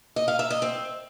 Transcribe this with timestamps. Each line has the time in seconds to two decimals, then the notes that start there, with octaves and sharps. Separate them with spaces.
0.16 D#5
0.28 F5
0.39 E5
0.51 D#5
0.62 C4